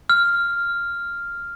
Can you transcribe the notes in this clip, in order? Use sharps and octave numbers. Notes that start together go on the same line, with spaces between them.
F6